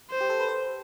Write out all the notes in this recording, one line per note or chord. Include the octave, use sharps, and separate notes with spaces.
C5
G4
A4
B4
C5